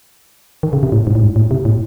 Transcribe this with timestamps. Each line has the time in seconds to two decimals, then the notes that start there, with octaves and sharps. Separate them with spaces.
0.63 D#3
0.73 C#3
0.83 C3
0.92 A2
1.07 G#2
1.15 A2
1.22 G#2
1.36 A2
1.51 C3
1.65 A2